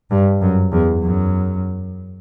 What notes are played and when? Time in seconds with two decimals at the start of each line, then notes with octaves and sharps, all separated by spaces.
0.11 G2
0.41 F#2
0.71 E2
1.02 F#2